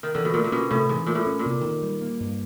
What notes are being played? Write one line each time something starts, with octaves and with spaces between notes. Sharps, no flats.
D#3
D3 E3
B2
A#2 A3
A#2
B2 C#4
A2 C3
G#2 E3
A#2 A3
A2
C#4
A#2
C3
D#3
G3
A#3
G2